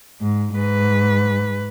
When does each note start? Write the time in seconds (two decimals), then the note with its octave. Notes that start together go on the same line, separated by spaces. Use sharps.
0.21 G#2
0.54 G#2 B4